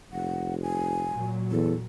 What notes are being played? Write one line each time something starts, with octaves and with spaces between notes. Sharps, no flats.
F1 F#5
G#5
A#2 F#3
E2 A4